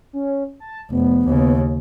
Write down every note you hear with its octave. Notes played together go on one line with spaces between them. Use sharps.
C#4
A5
F1 B3
D#2 C#3